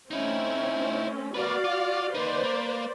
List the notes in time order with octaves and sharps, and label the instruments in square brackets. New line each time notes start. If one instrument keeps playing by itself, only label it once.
[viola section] A3 C4 C#4 [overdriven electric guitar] D#4 E4
[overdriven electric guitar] A#3 B4 [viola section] F#4 D5 F5
[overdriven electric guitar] F4
[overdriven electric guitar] A#3 D#4 [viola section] B4 C5 D5
[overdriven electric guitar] A#3